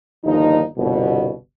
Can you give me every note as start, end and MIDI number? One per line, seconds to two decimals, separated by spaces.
0.24 0.62 31
0.24 0.62 39
0.24 0.62 53
0.24 0.62 63
0.78 1.31 31
0.78 1.31 36
0.78 1.31 47